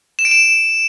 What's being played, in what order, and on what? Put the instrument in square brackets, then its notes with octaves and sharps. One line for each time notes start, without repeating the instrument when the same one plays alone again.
[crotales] E7
D7
E7